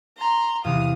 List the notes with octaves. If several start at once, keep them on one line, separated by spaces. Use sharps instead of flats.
A#5 C6
E2 C3 E3 F5 D#6